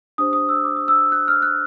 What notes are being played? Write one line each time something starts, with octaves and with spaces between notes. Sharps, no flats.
D4 G4 C5 D#6
D#6
E6
D6
D#6
E6
F#6
F6
F#6